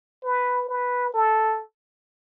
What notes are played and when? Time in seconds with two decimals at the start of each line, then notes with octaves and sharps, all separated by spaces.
0.24 B4
0.69 B4
1.14 A4